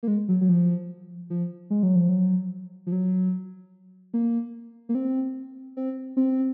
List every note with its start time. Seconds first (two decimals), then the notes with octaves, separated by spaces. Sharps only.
0.03 A#3
0.08 G#3
0.29 F#3
0.41 F#3
0.49 F3
1.30 F3
1.70 G#3
1.83 F#3
1.95 F3
2.09 F#3
2.87 F3
2.92 F#3
4.14 A#3
4.89 A#3
4.95 C4
5.77 C4
6.17 C4